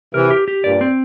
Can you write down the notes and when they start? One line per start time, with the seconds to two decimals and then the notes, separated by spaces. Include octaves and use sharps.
0.14 C3 E3 A#4
0.31 G4
0.48 G4
0.64 G2 A#2 D5
0.81 C4